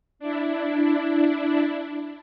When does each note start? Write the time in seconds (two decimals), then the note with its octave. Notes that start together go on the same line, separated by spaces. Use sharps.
0.19 D4 E4